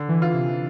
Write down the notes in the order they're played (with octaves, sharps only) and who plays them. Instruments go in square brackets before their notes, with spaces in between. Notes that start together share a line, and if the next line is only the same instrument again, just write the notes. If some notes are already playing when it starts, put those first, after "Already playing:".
Already playing: [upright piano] D3
[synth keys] E3
[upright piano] F4
[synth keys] C3